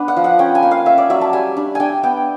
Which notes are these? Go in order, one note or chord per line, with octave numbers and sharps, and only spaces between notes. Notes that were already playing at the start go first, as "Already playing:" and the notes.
Already playing: B3 D4 B4
F#5
F3
F#5
C#4 G5
G#5
A#3
F5
C#4 E5
D5
F#3 E5
A5
G3 G#5
D4
D4 G5 G#5
B3 G5